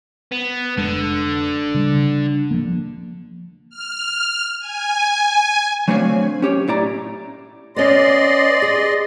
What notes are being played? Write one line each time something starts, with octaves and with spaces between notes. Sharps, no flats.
B3
F1 D3 G#3
C#3 G3
F3 A#3
F6
G#5
F#3 A3 C4 D4 C#5 F5
C#4 G4 C#5
A2 E4 D5 A#5
B3 C#4 D5 D#5 C6
G#4